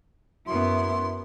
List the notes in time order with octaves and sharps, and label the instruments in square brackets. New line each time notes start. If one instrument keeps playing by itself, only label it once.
[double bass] F#2 [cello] B3 E4 [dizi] C6